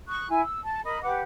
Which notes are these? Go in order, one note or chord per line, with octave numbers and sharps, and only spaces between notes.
C#6 D#6 F#6
E4 G#5
E6
A5
A#4 D#5 B5
G4 B4 F#5 D6